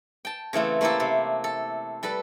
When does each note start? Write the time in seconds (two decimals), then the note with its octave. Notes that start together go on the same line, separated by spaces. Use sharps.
0.25 G5 A5
0.53 C#3 E3 A3 C4
0.81 A3 A#3 E4 G4 A4
1.00 C3
1.44 A4
2.03 G3 A4 B4